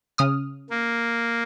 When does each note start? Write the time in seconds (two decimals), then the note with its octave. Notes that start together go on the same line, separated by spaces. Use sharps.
0.18 C#3 D#6 F6
0.70 A#3